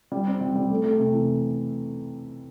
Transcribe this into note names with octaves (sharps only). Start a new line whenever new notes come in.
G3
C4
G3
G3
A3
A3
C3
E3